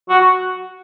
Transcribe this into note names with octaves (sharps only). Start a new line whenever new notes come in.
F#4